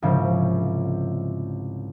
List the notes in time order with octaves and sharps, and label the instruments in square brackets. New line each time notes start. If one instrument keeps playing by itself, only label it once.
[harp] C2 G#2 C#3 F3